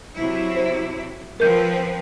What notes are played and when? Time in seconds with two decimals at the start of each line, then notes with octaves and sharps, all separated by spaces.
0.16 C3 F#3 E4
0.57 C5
1.40 F3 C4 A#4 B4 G6